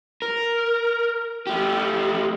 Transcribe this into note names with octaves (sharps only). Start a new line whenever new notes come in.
A#4
A3 G4